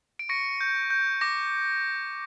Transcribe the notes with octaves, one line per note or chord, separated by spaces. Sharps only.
D7
C#6 A#6 C#7
G6
G6
D6 A#6